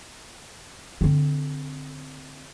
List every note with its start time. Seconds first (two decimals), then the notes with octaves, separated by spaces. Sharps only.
1.01 D3 C4